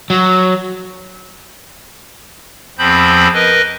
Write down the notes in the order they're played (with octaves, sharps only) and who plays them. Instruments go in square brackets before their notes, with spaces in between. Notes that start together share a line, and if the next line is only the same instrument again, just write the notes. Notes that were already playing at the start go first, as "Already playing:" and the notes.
[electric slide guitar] F#3
[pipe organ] E2 F3 C4 B5 G6
A#4 B4 D#5